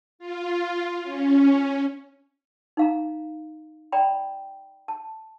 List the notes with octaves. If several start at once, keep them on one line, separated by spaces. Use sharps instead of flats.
F4
C#4
D#4 F5 A#5
D5 G5 A#5 B5
A5